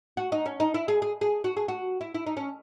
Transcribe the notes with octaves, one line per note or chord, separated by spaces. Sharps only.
F#4
D#4
C#4
D#4
E4
G#4
G#4
G#4
F#4
G#4
F#4
E4
E4
D#4
C#4